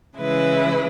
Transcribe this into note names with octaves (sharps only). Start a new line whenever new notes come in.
C#3 E3 G#3 E4 B4